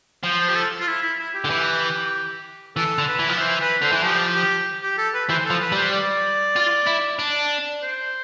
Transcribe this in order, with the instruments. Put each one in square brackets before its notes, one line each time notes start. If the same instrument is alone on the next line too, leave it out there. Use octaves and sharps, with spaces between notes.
[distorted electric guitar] F3 [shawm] C5
[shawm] C5
G4
A4
F4
E4
E4
E4
G4
[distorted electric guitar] D3
E3
[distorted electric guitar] E3 [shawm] A4
[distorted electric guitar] D3
[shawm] B4
[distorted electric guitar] E3
F3
[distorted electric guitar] E3 [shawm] C5
[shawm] B4
[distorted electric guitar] D3 [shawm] C5
[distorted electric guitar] E3
[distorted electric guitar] F3 [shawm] G4
[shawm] G4
G4
A4
B4
[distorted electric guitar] E3 [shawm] C5
[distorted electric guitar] F3 [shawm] A4
[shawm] B4
[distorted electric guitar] G3 [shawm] C5
[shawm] D5
[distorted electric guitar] F4
E4
D4
[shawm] C5